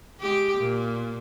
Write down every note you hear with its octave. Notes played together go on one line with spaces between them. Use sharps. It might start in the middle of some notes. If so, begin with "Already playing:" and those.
G#3 G4
A#2